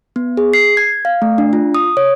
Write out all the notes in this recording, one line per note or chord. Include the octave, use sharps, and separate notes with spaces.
B3
G#4
C7
G#6
F5
A3
D4
F4
D#6
C#5